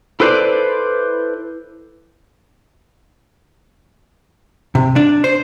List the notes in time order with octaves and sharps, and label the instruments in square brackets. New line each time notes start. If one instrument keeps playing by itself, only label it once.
[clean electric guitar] E4 A4 B4 C5 D5
[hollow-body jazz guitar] C3
D4
C5